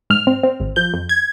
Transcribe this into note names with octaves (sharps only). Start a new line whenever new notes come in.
G#2 F6
C4
C4
G#1
F3 G6
F2
G#6